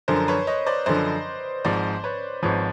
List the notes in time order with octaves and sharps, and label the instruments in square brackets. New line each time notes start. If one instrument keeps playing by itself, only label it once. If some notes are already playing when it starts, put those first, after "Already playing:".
[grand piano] F#2 D3 F3 [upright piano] A#4 C5
[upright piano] B4 C#5
C#5 D#5
C5 D5
[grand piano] F#2 D3 F3 [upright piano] C5 D5
[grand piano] G#1 G#2 F3 [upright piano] C5 D5
[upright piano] B4 C#5
[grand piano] G#1 G#2 F3 [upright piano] B4 C#5